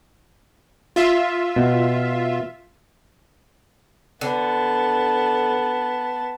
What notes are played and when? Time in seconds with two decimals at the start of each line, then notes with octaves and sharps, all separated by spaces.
0.96 F4 E5
1.56 B2
4.21 D3 B3 A5